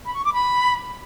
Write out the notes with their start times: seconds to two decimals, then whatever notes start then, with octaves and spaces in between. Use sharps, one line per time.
0.06 B5
0.15 C#6
0.24 D6
0.32 B5